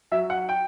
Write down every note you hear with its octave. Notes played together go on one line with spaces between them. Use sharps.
F#3 E5
F#5
G5